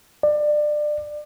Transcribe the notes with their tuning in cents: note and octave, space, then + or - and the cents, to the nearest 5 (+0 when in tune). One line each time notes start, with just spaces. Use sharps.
D5 +25